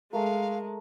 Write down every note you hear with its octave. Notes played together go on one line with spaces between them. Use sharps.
G#3 A3 A#4 F5